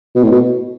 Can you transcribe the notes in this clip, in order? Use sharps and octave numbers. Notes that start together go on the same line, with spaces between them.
B2
A2
B2